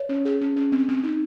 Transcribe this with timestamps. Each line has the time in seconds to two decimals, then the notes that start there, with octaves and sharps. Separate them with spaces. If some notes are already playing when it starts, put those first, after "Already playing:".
Already playing: C#5
0.09 C#4
0.25 G#4
0.41 C#4
0.56 C#4
0.72 C4
0.88 C4
1.04 D#4